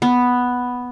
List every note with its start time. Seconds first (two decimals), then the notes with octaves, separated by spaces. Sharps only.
0.02 B3